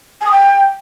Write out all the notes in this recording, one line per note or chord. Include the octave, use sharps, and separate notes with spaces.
G#5
D#6
G5